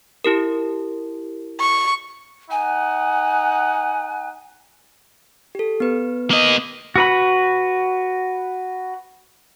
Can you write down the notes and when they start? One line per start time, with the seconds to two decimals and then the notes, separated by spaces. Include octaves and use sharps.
0.24 E4 G4 A#4
1.60 C#6
2.51 D#4 F#5 G#5
5.55 G4 A4
5.80 B3 B4
6.31 A#3 D#5
6.96 F#4 B4 B5